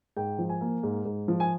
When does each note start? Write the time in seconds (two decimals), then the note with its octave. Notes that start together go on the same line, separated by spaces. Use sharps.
0.17 G#2 G5
0.39 F3
0.49 G#5
0.61 A#3
0.83 G#2
1.05 G#2
1.28 F3
1.40 G#5